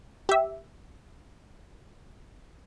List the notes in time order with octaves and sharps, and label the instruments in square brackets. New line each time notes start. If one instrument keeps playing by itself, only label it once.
[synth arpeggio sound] G4 E5